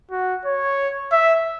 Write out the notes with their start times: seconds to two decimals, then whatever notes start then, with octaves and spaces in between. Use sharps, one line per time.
0.11 F#4
0.45 C#5
1.12 E5